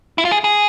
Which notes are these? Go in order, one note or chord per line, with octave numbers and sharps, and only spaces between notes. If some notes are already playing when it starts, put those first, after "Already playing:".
E4
F4
G#4
G#4